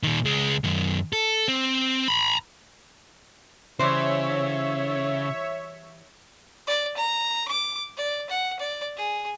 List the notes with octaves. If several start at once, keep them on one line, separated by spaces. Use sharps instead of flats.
A#2 D#3
C#2 G#3
F#2 D#3
A4
C4
A#5 B5
C#3 E3 G3 C5 C#5 E5
D5
A#5
D6
D5
F#5
D5
G#4